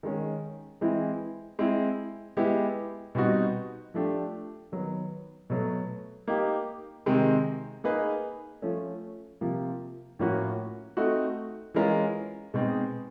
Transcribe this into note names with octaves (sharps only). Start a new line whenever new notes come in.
D#3 G#3 C#4
E3 G#3 C4 E4
G#3 C4 E4
G#3 B3 E4 G4
B2 G3 C4 D#4 F#4
F3 A3 D4 G4
D#3 F#3 B3
B2 F#3 A3
A#3 D#4 G4
C3 D#3 G#3 C4
A#3 D#4 G#4 B4
F3 A3 C#4
C3 F3 A#3
A2 F3 A#3 C#4 F#4
A3 C4 D#4 F#4
E3 G#3 C#4 F4 A#4
B2 G#3 C4 D#4